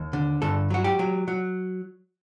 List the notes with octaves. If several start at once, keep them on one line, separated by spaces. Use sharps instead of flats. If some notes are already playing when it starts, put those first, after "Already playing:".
Already playing: D#2
D3
G2 A4
F#3 F#4
G4
F#3
F#3